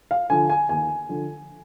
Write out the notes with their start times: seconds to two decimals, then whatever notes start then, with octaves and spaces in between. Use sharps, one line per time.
0.11 F5
0.30 D3 F3 G#5
0.50 G#5
0.69 D#2 G#5
1.09 D3 F3